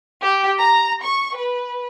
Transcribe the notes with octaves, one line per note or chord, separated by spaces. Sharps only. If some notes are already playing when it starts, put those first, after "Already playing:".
G4
A#5
C#6
B4